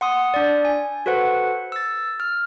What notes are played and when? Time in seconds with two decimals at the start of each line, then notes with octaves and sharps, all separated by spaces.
0.01 F#5 C6 D#6
0.34 D4 D5
0.65 G#5
1.06 F#4 A4 B4 C5 F#5
1.72 E6 A6
2.20 F6